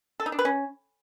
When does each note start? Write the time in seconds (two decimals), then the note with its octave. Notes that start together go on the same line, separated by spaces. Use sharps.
0.20 A4
0.26 D#4
0.32 D4
0.39 B4
0.45 C#4